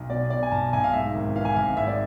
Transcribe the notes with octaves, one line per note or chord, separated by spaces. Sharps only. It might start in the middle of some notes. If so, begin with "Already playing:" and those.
Already playing: B1
B2 D5
B2 D5
G#5
B1 A5
B1 G#5
F5
G#2 E5
G#1
E3 F5
G#5
G#1 F5
G#2 E5
D5